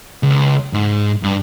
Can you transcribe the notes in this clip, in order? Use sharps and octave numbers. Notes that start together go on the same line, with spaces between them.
C#2
G#2
G2